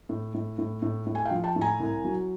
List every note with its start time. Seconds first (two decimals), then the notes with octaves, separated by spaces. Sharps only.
0.09 A2
0.34 A2
0.58 A2
0.82 A2
1.06 A2
1.15 G#5
1.25 F5 G5
1.31 F3
1.44 G5 A5
1.56 A2
1.61 G#5 A#5
1.80 C2
2.04 F#3